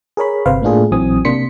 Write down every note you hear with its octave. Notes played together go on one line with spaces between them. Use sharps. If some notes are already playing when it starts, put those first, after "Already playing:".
G#4 A#4 C#5 B5
G1 C3 B4 C5 F5
A2 A3 A#3 D4 F4 G#4
A#1 E3 F#3 C4 G#5 D#6
C3 A#3 D4 C6 B6 C#7